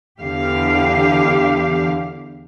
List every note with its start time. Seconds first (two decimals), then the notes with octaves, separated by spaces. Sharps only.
0.20 E2 D3 G4 F5